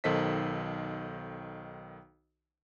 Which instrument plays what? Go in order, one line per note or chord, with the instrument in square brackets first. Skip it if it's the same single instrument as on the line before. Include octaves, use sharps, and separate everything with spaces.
[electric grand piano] B1 D#3 A4 C5 D#5 B6